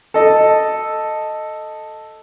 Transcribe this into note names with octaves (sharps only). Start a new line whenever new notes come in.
A4 D#5